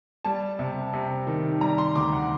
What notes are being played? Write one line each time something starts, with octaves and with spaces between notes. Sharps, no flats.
G3 A5
C3
C3
D#3
G3 A#5
C6
D2 D6
F#5